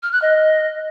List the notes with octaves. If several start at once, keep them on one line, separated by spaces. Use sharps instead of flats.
F6
F#6
D#5